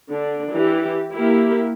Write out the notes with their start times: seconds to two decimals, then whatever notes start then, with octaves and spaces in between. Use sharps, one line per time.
0.10 D3 D4
0.52 E3 E4 G4
1.13 A#3 E4 G4